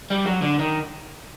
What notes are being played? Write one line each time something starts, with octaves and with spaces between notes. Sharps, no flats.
G3
F#3
D3
D#3